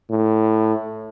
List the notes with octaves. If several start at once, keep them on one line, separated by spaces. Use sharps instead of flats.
A2